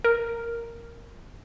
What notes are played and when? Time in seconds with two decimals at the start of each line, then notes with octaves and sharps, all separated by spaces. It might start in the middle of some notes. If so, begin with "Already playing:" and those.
0.05 A#4